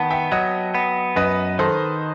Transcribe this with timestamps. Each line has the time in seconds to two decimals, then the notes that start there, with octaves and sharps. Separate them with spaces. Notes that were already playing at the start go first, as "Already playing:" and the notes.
Already playing: D#3 B3 F#5 G5 A5
0.10 E5 G5
0.31 F#3 D#5 F#5
0.75 B3
1.16 F#2 B4 D#5
1.59 D#3 A4 C5